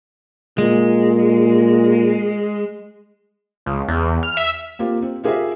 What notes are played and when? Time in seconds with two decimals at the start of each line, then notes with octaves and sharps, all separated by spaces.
0.58 A#2 G#3
3.66 C#2
3.88 E2
4.23 F6
4.37 E5
4.79 A#3 C4 F4 G4
5.02 C4
5.24 F4 G4 G#4 A#4 C5 E5